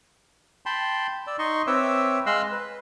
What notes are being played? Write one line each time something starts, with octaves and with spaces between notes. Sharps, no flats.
G5 A5 B5 C6
D5 E6
D#4 D#5 C6 C#6
C4 B4 C#5 E5 D6 E6
G#3 D#5 F5 C6 E6 F#6
B4